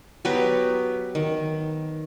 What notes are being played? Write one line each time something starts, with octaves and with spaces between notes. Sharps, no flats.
F#3 B3 G4 B4
D#3